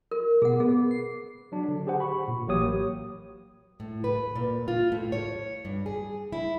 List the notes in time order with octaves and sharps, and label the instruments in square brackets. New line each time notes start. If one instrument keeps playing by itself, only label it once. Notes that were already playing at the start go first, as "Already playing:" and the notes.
[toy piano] A#4
[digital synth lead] B2 [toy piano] G#4 F#5
[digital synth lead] B3 [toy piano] G#4
[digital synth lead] C7
[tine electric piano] F#3 D4
D3
G4 G#4 C5 F#5
B5 C#6
A#2
A1 F#3 A#3 G4 C#5 D#6
[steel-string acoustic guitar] A2
B4
A#2
F4
A2
C#5
G2
G#4
E4